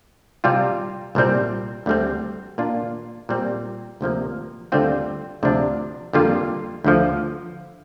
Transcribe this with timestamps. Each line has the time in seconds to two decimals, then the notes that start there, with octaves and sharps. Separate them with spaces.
0.44 C3 G3 C4 F4
1.15 C2 A#2 G3 C4
1.86 D2 D3 G3 C4
2.58 A#2 A#3 D4 F4
3.29 A#2 G3 C4
4.01 D2 C3 F3 A#3
4.72 D2 D3 G3 C4 F4
5.43 D2 C3 F3 D4
6.13 F2 D3 G3 A#3 F4
6.84 D2 D3 F3